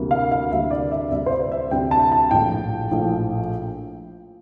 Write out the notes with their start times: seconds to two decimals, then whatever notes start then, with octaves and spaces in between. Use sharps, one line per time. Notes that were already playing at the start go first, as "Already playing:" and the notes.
Already playing: D2 C3 G3 A#3
0.11 F5
0.31 F5
0.51 D2 C3 G3 A#3 E5
0.71 D5
0.91 E5
1.11 D2 C3 G3 C4 E5
1.26 C5
1.31 D5
1.52 E5
1.71 D2 C3 G3 C4 G5
1.91 A5
2.12 A5
2.31 A#1 A2 F3 G5
2.91 A#1 A2 F3